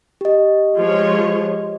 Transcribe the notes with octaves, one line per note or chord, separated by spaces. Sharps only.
G4 D#5
F3 G#3 C#5